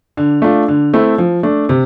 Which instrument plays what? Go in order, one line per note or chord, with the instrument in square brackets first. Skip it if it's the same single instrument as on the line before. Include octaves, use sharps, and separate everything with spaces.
[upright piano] D3
A3 D4 F4
D3
A3 C4 E4
F3
A3 D4
C3